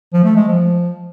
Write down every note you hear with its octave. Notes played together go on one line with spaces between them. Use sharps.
F3
A3
G#3
F3